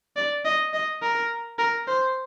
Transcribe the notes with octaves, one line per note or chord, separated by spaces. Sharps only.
D5
D#5
D#5
A#4
A#4
C5